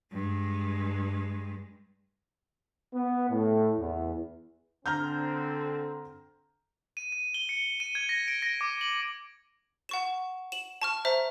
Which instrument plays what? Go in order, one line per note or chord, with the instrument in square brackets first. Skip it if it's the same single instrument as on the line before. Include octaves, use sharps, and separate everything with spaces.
[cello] G2 G#3
[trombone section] B3
A2
E2
[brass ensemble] D3 C4 [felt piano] A#5 F6 G6
[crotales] D#7
D#7
G7
C#7
D#7
G#6
A#6
D7
A#6
D6
F#7
[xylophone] F#5 C#6 E7
E7 F#7
A5 C#6 F6
C5 E5 A#5